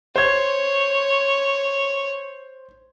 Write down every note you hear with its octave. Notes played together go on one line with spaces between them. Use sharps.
C5 C#5 G#6